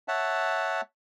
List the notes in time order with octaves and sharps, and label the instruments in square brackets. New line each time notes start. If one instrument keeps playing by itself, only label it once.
[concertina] C#5 E5 F#5 A5